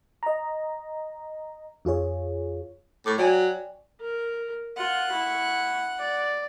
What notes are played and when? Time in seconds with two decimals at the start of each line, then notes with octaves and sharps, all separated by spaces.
0.23 D#5 A#5
1.85 F2 F4 G#4 C#5
3.06 A2 C#6 D6
3.18 F#3 D5 G5 G#5
4.01 A#4
4.77 F4 F#5
5.11 E4 C#6
5.99 D5